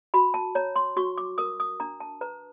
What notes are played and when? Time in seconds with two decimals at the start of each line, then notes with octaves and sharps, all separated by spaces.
0.14 F#4 B5
0.34 A5
0.55 C#5 A#5
0.76 C6
0.97 F#4 C#6
1.18 D6
1.38 A#4 D#6
1.60 D#6
1.80 D4 A#5
2.00 A5
2.21 B4 A#5